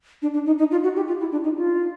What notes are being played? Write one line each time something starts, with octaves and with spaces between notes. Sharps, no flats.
D4
D4
D#4
D#4
F4
F#4
G4
F4
E4
D4
D#4
F4